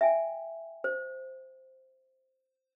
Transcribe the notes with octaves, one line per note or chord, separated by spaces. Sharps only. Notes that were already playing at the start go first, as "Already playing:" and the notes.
E5 G5 G#5
C5